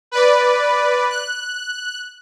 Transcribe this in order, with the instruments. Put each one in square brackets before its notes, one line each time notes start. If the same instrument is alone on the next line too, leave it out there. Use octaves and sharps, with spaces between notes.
[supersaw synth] B4 D5
F#6